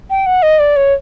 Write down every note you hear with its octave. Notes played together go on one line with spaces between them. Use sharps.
G5
F#5
D#5
D5
C#5